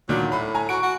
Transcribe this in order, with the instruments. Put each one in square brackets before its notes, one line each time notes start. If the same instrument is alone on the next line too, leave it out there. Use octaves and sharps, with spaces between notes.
[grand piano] A#2 D3 D#3 [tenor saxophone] F#3
[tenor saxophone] A2 [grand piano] B5
[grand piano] G#5 A#5
[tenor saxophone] F#4 [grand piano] C#6 D7
[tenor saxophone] F#4